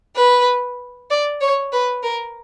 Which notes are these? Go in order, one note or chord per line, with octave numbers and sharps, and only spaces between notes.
B4
D5
C#5
B4
A#4